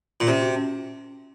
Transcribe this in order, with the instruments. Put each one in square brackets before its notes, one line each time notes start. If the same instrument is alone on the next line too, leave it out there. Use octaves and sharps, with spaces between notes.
[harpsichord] A#2
[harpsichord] C3 [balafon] C#4
[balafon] F#4
C#4